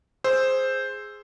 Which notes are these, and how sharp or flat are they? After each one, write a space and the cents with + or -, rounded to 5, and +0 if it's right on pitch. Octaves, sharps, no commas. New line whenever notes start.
G#4 +0 C5 +0 E6 +0